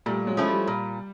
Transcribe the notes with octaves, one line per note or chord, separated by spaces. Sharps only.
A#2 G3 A3
F#3 G#3
F3 A3 C#4 E4
G3
A#2